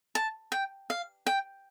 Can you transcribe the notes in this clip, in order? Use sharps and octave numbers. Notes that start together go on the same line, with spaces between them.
A5
G5
F5
G5